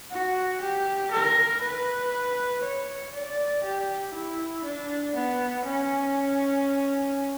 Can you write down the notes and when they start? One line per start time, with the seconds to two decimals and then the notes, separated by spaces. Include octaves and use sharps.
0.11 F#4
0.61 G4
1.11 A#4
1.62 B4
2.63 C#5
3.13 D5
3.63 G4
4.14 E4
4.64 D4
5.15 B3
5.65 C#4